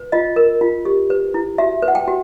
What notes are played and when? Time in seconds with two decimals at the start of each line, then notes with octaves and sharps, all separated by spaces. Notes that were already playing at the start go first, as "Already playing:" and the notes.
Already playing: B4
0.12 F4 D#5
0.36 A#4
0.61 F4
0.85 G4
1.10 B4
1.34 E4
1.58 F#4 E5
1.82 B4
1.88 F#5
1.95 G5
2.08 F#4